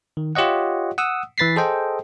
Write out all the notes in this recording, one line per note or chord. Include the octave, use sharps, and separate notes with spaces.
D#3
F4 G4 C#5 D#5 F#5
F#5 D#6 E6
E3 B4 A6 B6 C7
G#4 A4 C5 D#5 G5